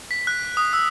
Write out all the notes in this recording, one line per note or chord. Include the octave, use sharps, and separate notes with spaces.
B6
F#6
D#6
E6